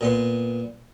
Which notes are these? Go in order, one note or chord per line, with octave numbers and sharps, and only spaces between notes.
A#2 B3 C6